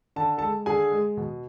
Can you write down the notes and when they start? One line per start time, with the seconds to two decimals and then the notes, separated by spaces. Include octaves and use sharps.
0.16 D3 A5
0.38 G#3 A4 A5
0.66 D3 G#4 G#5
0.92 G#3
1.17 B2